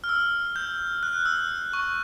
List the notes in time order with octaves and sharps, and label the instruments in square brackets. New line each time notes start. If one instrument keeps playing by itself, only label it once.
[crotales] F6
E6
G6
F#6
E6
C#6